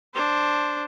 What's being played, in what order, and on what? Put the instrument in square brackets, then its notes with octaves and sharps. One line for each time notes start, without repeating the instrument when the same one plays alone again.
[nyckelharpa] D4 C5